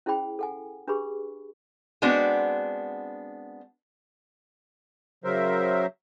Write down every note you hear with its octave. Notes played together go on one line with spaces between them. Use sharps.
C#4 E4 G#4 C5 G5 B5
A4 F#5 G#5
D4 G4 G#4 B4 B5 C#6
G#3 B3 C4 D4 F#4
C#3 F#3 A#4 C5 E5